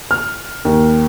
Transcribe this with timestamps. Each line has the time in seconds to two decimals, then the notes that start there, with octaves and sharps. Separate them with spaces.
0.11 F6
0.65 D#2